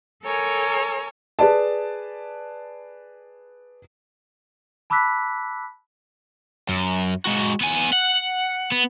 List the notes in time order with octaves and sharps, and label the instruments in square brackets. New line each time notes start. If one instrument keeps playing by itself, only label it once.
[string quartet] A4 A#4 C#5 G#5
[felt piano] G#4 B4 D5 A5
[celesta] A5 B5 D6 E6 F#6 B6
[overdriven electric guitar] F#2
G#3 F#4
B3 G#5
F#5
B3